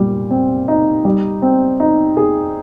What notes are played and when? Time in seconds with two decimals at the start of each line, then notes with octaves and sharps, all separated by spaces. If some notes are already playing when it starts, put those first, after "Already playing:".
Already playing: A#2 G3
0.31 C4
0.68 D#4
1.05 G3
1.42 C4
1.80 D#4
2.17 G#4